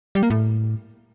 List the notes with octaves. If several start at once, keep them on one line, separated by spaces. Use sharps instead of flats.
G3
A#3
A2